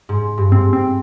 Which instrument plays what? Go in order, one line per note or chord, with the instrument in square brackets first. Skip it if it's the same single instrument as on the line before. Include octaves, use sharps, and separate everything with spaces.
[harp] G#2
G2
[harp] G#2 [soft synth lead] C4
[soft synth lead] C4